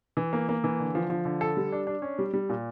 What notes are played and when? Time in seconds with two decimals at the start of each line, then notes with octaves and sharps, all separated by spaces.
0.17 E3
0.33 A#3
0.49 A#3
0.64 E3
0.80 D3
0.95 F3
1.10 F3
1.25 D3
1.41 A4
1.57 G3
1.72 D4
1.87 D4
2.02 C#4
2.19 G3
2.34 G3
2.49 A#2